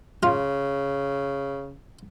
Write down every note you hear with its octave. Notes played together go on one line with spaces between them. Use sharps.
C#3 F4